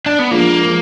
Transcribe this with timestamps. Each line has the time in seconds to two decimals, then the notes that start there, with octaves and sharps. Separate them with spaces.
0.06 D4
0.19 B3
0.31 F3 G#3 A#3 D4 F4 A#4
0.65 F3 G#3